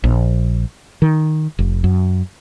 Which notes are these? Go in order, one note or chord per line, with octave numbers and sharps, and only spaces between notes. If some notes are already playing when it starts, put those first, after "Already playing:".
A#1
D#3
F1
F#2